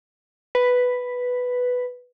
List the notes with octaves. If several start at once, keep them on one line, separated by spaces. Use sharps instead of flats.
B4